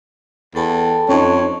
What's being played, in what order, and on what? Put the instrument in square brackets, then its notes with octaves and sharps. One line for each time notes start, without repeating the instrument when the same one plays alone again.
[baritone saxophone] E2 [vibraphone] A4 G5 A5
[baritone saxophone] F2 [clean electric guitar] C#4 D#4 [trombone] C#5